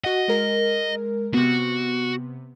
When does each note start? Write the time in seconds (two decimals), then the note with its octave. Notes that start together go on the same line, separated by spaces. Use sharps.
0.04 F#4 D#5 F#5
0.28 G#3 A#4
1.34 C3 B3 F#4